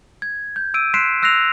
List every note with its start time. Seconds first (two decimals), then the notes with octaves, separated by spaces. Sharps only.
0.22 G#6
0.56 G6
0.74 E6 D7 D#7
0.94 C6 F#6 B6 C7 D7 E7
1.23 E6 F#6 A#6 C7 F7